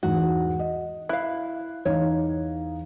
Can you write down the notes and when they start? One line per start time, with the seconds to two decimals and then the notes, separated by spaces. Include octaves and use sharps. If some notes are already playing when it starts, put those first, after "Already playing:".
0.03 E2 G#2 F#4
0.59 D#5
1.09 E4 F5 F#6
1.85 E2 D#4 C#5 F5